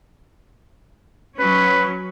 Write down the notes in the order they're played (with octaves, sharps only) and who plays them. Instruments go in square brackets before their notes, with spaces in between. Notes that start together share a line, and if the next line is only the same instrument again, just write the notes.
[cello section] F#3 C#4 [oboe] B4